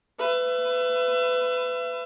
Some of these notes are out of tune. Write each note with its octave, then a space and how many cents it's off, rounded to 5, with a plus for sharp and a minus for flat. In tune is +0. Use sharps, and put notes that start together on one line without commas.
B4 +25 E5 +30